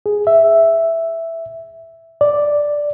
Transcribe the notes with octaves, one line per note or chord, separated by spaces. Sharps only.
G#4
E5
D5